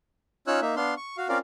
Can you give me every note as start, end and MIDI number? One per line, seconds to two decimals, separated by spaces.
0.47 0.60 61
0.47 0.60 63
0.47 0.60 65
0.47 0.60 73
0.47 0.60 88
0.47 0.60 90
0.62 0.75 58
0.62 0.75 63
0.62 0.75 76
0.76 0.94 59
0.76 0.94 62
0.76 0.94 77
0.76 0.94 84
0.97 1.17 85
1.17 1.28 66
1.17 1.28 77
1.29 1.38 60
1.29 1.38 61
1.29 1.38 65
1.29 1.38 70
1.29 1.38 74
1.29 1.38 77